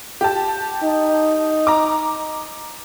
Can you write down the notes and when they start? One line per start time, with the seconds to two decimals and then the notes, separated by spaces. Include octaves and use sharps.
0.21 G4 A5
0.84 D#4
1.67 A#5 D6